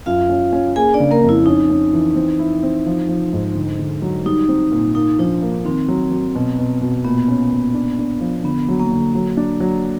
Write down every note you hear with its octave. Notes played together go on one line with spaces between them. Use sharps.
F#2 F4 F5
C#4
C#4
A#3 G#4 G#5
D4 D5
C#3
A#3 A#4
F2
E4
C#4 D#4
C#4
E3
C4
E4
C4
F3
F3
G#2
D3
D3
F#3
G3 D#4
C4
A#2
A#3 D#4
F3 D4
A#3
D#3 C4
F#3
F#3
B2
B2
B2
A#2 B3
C#4
A#2
D4
D4
F3
D3 B3
F#3
A#3
D3
F#3 A#3
D4
F#3